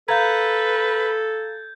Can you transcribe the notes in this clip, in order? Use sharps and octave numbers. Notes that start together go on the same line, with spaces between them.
A4 B4 F5 A#5 G6 G#6